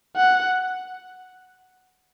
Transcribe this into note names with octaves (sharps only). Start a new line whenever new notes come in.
F#5